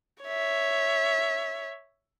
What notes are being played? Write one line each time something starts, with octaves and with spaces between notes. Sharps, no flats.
C#5 E5